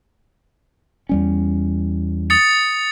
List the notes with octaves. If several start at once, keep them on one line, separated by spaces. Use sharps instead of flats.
E2 G3 C#4
D#6 A6 C#7